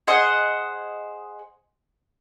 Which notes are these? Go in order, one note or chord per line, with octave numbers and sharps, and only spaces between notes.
G#4 C5 D#5 F#5